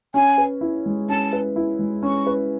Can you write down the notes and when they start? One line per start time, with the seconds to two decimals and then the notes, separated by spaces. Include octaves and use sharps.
0.14 C#4 G#5
0.38 B4
0.61 E4
0.86 G#3
1.09 C#4 A5
1.33 B4
1.56 E4
1.79 G#3
2.03 C#4 C#6
2.27 B4